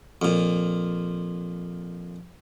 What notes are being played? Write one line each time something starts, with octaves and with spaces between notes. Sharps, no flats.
F2 A#2